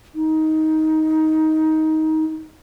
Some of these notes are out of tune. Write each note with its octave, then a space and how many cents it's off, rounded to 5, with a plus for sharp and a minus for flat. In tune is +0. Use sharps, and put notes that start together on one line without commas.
D#4 +15